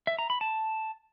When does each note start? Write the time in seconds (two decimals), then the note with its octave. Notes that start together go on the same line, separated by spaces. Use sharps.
0.07 E5
0.19 A#5
0.30 B5
0.41 A5